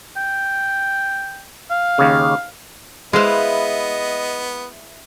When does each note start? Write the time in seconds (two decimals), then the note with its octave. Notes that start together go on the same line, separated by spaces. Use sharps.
0.17 G5
1.70 F5
1.98 D#2 C#3
3.13 G#3 B3 E4 B4 C5 D#5 F5